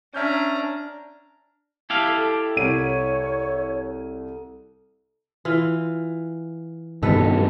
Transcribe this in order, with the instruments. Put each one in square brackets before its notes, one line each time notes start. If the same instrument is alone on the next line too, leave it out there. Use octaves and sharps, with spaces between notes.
[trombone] C#4 [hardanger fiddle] D4 A#5 [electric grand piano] E5 F6 G6
[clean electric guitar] E4 G4 F5 [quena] A5
[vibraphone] A4
[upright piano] C2 D#7 [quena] C#5
[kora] E3 F4
[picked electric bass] G2 B2 D#3 [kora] A4 B4